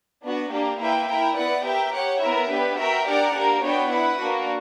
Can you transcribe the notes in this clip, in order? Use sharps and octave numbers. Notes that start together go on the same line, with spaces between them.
B3 D4 F#4
A#3 D4 G4
A#3 E4 B4 E5 G5
E4 A#4 E5 G5
B3 E4 B4 D5 F#5
G4 A#4 E5 G5
G4 C#5 F#5
B3 E4 A#4 E5
B3 D4 G4 B4
F#4 A#4 E5 G5
D4 G4 A#4 D5 F#5
A#3 D4 G4 A#4
B3 D4 F#4 C#5 G5
E4 B4 F#5
A#3 D4 F#4